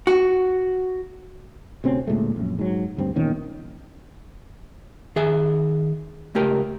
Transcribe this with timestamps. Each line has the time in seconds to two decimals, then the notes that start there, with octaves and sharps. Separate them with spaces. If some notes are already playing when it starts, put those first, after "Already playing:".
0.07 F#4
1.84 D2 C3 C4 C#4
2.07 D2 A#2 G#3 A3
2.36 A#1 F#2
2.59 G#2 F#3
2.97 D2 G2 C4
3.16 E2 A#2 D#3 C#4
5.16 D#3 G#4 E5
6.35 C#2 A3 G4 A#4